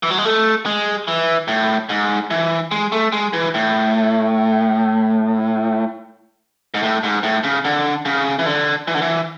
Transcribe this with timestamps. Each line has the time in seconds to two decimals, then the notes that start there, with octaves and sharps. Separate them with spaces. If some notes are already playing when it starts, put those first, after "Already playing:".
0.03 E3
0.10 F#3
0.18 G#3
0.25 A3
0.66 G#3
1.08 E3
1.48 A2
1.89 G#2
2.30 E3
2.71 G#3
2.92 A3
3.12 G#3
3.33 E3
3.54 A2
6.74 G#2
6.83 A2
7.03 G#2
7.23 A2
7.44 C#3
7.65 D3
8.05 C#3
8.39 E3
8.46 D3
8.87 E3
8.95 D3
9.02 E3